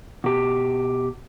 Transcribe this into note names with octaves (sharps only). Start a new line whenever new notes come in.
B2 G4